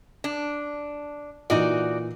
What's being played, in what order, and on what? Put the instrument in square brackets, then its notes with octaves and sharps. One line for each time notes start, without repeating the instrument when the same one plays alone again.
[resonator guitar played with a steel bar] D4
[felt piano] A#2 E3 [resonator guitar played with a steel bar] D#4 F#4 D5